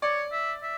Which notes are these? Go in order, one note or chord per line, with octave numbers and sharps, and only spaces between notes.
C#5 D5
E5
E5